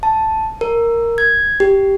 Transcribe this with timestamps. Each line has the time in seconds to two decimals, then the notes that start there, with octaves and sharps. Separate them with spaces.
0.03 A5
0.61 A#4
1.18 G#6
1.60 G4